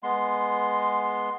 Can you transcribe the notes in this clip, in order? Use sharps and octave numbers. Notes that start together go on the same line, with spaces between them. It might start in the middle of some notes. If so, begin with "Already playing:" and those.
G#3 B3 C6